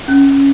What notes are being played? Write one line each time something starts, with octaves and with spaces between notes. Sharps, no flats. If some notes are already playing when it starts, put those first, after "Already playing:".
C#4